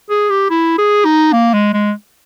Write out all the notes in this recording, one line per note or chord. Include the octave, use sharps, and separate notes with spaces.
G#4
G4
E4
G#4
D#4
A#3
G#3
G#3